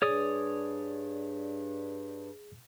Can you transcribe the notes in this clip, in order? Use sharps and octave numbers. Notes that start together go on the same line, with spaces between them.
G2 G#4 C#5 D5 D#6